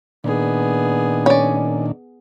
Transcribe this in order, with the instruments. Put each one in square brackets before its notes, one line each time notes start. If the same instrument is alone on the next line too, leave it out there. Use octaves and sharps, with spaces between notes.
[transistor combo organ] A#2 D#3 D4 [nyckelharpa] B3 G#4
[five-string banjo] C#4 D5